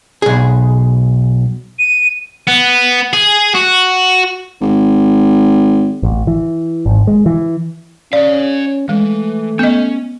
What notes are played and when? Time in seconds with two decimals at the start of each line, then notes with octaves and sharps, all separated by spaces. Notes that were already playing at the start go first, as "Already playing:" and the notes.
0.22 B1 G#4
1.79 D#7
2.48 B3
3.13 G#4
3.55 F#4
4.61 G#1
6.03 A1
6.27 E3
6.86 G#1
7.07 G#3
7.26 E3
8.13 C#4 C#5 D5 F5
8.89 E3 G#3 A3
9.59 B3 C#4 D#5